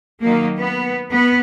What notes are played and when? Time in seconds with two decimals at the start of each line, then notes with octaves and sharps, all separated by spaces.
0.22 D#3 F#3 A#3
0.59 B3
1.12 B3